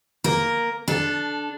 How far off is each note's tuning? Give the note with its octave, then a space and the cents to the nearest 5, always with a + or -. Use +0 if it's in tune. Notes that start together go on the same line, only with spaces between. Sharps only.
A#3 +0 A#4 +0
D4 +0 A4 -20